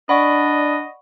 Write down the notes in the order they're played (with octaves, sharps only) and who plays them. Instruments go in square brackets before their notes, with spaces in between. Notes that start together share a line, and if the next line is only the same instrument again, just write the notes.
[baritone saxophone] D4 [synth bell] D5 F#5 C#6 [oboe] D#5 [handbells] B5